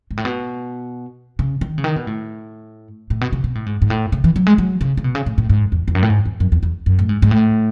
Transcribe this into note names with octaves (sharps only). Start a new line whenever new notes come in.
G#2
A2
B2
C#3
D#3
C#3
D#3
B2
A2
A2
B2
C#3
B2
A2
G#2
G#2
A2
C#3
E3
F#3
G#3
F#3
C#3
C#3
B2
C#3
A2
A2
G#2
E2
E2
F#2
A2
G#2
E2
F#2
E2
E2
F#2
A2
G#2
G#2
A2